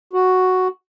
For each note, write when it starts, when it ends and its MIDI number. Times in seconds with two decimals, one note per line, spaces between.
0.13 0.68 66